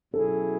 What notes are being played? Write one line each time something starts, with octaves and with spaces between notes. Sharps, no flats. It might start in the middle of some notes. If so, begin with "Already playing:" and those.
B2 F#3 C#4 E4 G#4 A4